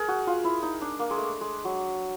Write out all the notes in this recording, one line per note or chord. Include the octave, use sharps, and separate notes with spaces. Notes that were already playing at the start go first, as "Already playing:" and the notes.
Already playing: G#4 A#4
F#4
F4
E4
D#4
D4
A#3
G#3
A3
G#3
F#3